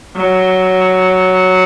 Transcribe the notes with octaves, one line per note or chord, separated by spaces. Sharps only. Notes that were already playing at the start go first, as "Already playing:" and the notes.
F#3